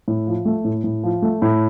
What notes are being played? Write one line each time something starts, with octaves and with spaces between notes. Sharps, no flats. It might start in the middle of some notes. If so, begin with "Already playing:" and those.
A2
F3
A3
A2
A2
F3
A3
A2